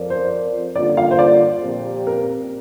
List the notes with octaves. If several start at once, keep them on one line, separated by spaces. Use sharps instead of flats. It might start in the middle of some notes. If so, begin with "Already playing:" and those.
Already playing: F2 F3 C4 A#4 D5
C5
G2 D3 A#3 F4 D5
F5
C5
D5
A#2 F3 C4 G4
A#4